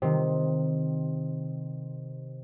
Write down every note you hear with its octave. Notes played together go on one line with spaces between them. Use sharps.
C3 D#3